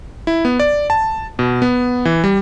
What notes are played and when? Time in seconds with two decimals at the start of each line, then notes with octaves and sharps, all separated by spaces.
0.27 E4
0.45 B3
0.60 D5
0.90 A5
1.39 B2
1.62 B3
2.05 E3
2.24 G3